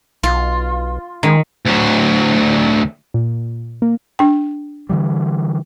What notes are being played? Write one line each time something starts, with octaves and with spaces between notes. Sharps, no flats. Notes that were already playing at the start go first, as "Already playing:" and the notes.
B1 F4
D#3 G#3
D2 F#3
A#2
A#3
D4 G5
D3 E3 G3